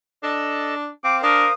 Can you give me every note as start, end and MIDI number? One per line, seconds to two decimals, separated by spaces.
0.23 0.88 62
0.23 0.75 69
0.23 0.75 75
0.23 0.75 81
1.04 1.21 60
1.04 1.53 72
1.04 1.53 77
1.04 1.17 86
1.23 1.45 62
1.23 1.49 70
1.23 1.54 87